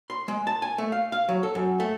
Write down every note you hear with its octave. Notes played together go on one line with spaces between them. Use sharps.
C6
G#3
A5
G#5
A3
F5
F5
F#3
A4
F#2
A3